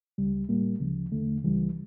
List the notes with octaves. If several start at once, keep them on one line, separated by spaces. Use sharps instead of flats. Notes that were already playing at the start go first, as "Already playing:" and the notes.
C#2 C#3 G3
A2 G3 A#3
D2 C#3 F3
E2 D3 A3
C#2 C#3 E3 G3